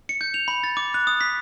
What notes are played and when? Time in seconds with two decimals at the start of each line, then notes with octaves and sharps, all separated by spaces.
0.09 C#7
0.21 G6
0.34 F7
0.48 B5
0.64 A6
0.77 D6
0.94 F#6
1.07 D#6
1.21 B6